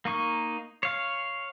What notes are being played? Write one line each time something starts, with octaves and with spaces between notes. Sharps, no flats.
A#3 D#4 C#6
C#5 F5